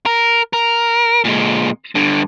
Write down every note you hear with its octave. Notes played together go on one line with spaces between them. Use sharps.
A#4
A#4
A#2 G#3
G2 D3